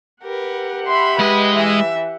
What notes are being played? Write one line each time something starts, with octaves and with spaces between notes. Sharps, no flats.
G4 A#4 B4 F#5
E5 B5 C6
G#3 B4 D#5
E3 E5